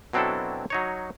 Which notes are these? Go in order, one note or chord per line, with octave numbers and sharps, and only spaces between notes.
B2 F#3 C4 D4 E4 A4
F#3 D#4 C#5